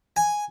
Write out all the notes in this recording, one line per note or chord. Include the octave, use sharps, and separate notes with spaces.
G#5